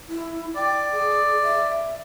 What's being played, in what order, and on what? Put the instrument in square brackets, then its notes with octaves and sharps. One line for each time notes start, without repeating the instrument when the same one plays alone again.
[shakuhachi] E4
[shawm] D5 [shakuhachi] G5
[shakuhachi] G#4
E5